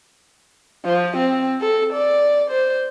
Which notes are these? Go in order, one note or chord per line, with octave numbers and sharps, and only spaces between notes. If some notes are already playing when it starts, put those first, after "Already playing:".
F3
C4
A4
D5
C5